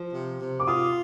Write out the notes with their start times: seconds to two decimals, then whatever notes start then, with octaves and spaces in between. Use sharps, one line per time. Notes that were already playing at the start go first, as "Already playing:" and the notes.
Already playing: F3
0.13 C3
0.40 C3
0.60 D6
0.67 F4 D#6